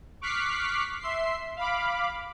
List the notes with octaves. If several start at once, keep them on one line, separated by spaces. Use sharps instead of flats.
C#6 D6 F6 F#6 B6 C7
E5 C6 C7
F5 B5 D6